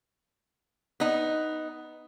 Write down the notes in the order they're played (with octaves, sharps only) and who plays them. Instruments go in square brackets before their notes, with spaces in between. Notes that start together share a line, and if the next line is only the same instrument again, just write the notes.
[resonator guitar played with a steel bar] B3 D#4